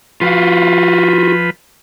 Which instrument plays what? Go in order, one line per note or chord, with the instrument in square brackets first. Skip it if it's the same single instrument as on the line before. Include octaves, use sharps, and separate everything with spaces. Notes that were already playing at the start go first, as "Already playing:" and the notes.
[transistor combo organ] F3 B4 [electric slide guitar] F4 F#4 F5